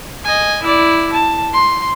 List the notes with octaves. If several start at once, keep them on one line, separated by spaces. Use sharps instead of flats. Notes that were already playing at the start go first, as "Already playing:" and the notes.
D#5 G#5
E4 D5
A5
C6